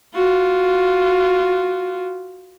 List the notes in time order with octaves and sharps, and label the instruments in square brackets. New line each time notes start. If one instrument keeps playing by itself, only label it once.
[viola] F4 F#4